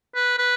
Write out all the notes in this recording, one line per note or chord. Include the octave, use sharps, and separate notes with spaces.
B4
B4